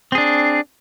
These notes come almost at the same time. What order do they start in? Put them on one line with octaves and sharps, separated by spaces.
C4 G#4 D4